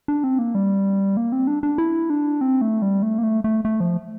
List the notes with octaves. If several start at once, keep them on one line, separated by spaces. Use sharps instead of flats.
D4
C4
A#3
G3
A#3
C4
D4
D4
E4
D4
C4
A3
G3
A3
A#3
A3
A3
A3
F3